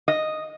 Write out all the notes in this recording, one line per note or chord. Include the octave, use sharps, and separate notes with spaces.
D#5